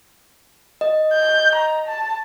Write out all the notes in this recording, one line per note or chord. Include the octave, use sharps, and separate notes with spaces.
D#5
G6
A#5
A5